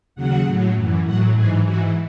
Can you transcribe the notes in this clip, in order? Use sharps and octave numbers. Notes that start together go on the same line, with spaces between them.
D#2 C#3 F#3 F#5
A2 F#3
F#2 E3
A2 F#3 F#5
G#2 E3 G#4
G#2 E3 F#4